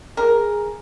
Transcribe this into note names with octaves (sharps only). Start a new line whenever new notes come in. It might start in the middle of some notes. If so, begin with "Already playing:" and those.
G#4 A#4